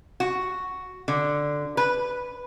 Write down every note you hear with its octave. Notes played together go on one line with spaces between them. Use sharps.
F#4
D3
B4